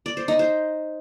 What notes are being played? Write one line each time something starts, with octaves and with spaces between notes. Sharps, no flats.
D5
C5
D#4
C5